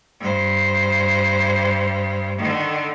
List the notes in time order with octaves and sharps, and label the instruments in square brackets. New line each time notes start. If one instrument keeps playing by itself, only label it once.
[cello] G2 C5
D3 D#3